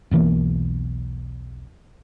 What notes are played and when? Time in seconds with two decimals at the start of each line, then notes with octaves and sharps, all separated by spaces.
0.11 E1 B1 E3 A#3